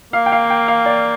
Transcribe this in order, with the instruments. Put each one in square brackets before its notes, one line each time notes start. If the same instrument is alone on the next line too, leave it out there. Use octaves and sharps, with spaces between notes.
[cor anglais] A#3 [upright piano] F5
[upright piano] G5
F5
G5
F5
D5